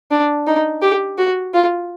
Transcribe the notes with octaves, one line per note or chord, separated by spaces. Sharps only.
D4
D#4
G4
F#4
F4